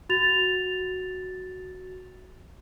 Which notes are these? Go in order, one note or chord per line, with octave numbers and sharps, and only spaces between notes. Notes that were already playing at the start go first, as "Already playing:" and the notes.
F#4 A6 F7